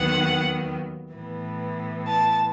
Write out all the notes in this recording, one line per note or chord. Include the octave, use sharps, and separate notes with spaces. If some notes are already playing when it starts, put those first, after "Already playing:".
Already playing: D#2 D#3 F#3 B3 F#5
A2 E3 B3
A5